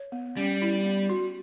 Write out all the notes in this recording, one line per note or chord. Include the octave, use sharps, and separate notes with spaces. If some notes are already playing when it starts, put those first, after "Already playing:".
Already playing: C#5
B3
G3 C#4
E4
B3
F#4